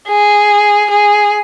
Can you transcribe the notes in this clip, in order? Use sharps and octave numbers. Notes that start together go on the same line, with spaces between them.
G#4
G#4